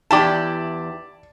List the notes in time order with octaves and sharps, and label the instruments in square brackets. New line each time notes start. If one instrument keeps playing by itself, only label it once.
[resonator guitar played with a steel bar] E2 E4 G4 [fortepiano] D5 A5